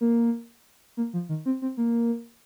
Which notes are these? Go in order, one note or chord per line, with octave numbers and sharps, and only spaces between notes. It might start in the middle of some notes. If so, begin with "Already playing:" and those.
A#3
A#3
F3
D#3
C4
C4
A#3